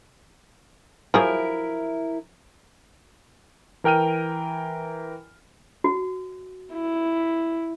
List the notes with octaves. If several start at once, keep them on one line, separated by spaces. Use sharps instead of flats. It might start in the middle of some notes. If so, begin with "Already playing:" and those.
F3 F#3 E4 G#4 A#4
E3 A#4 G5 F6 D#7
F#4
E4